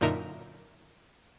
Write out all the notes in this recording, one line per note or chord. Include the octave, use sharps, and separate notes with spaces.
F#2 A#2 D3 D#4 A#4 E5